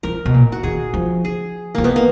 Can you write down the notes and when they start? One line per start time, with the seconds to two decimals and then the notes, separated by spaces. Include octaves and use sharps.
0.03 F3 A#4
0.25 B2
0.34 A#2
0.52 F#4
0.63 D#3 G#4
0.94 F3
1.25 G#4
1.75 F3 A#3
1.84 D#3 B3
1.96 A#3